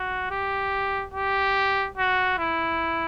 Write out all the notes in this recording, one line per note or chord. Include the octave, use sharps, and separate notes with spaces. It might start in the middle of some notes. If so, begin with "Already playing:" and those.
Already playing: F#4
G4
G4
F#4
E4